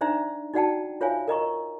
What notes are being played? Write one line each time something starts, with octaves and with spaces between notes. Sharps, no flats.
D4 D#4 C5 D5 E5 A#5
D#4 F#4 D5 F#5 G5 A5
F4 C5 C#5 E5 F5 G#5
A#4 D#5 A#5 C#6